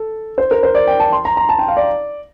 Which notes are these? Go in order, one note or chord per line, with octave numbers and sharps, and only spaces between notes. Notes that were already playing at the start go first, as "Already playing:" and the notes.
Already playing: A4
C5
A#4
C5
D5
G5
A5
C6
A#5
A#5
A5
G5
F5
D5